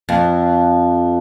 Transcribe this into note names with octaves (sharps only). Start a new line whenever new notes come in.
F2